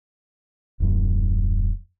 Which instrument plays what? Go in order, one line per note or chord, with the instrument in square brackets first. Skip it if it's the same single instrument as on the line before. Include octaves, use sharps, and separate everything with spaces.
[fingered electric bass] D#1 F#2